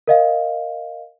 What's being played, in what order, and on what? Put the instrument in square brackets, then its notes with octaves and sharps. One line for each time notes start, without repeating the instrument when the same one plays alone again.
[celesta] A#4 D#5 F5